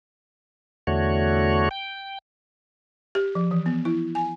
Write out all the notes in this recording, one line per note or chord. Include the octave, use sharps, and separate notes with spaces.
E2 D3 A3 F#4 C#5
G5
G4
F3
E3
B3
E4
G#5